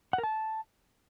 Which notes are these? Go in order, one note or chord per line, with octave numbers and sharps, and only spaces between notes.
F#5
A#4
A5